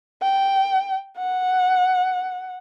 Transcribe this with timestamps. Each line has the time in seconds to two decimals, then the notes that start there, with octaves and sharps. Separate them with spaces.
0.22 G5
1.18 F#5